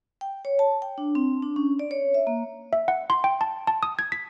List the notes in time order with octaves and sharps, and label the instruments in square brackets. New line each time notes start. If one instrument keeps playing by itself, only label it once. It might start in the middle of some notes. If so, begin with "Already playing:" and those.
[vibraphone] G5
C#5
A5
G5
D4
C4
D4
C#4
D5
C#5
E5
A#3
[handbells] E5
F#5
C6
G5
A5
A5
D#6
G#6
B6